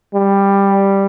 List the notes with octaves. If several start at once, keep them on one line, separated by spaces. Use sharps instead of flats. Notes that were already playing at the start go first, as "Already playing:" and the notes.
G3